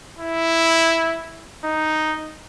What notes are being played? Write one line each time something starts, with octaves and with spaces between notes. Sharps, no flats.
E4
D#4